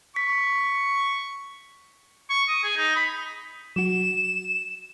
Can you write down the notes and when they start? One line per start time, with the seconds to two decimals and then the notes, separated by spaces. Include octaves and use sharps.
0.16 C#6 B6
2.30 C#6
2.48 D#6
2.63 G#4
2.77 D#4
2.96 B5
3.76 F#3 F#4 E7